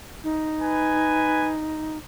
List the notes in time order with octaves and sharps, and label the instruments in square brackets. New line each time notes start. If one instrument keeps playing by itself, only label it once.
[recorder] D#4
[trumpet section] B4 G#5